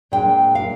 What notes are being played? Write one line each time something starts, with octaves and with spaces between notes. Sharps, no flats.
A#2 G#3 D4 G5
F5